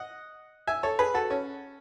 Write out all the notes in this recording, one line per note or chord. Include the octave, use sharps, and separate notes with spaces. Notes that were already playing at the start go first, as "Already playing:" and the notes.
Already playing: D#5 F#5
E5 G#5
A4 C#5
G#4 B4
F#4 A4
C#4